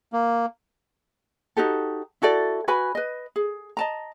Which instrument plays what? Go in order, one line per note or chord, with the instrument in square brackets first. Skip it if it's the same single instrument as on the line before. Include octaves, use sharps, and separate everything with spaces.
[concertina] A#3
[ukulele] D#4 F#4 G4 A4
E4 F#4 A4 D5
F#4 B4 G#5 B5
B4 D#5
G#4
D#5 A5 A#5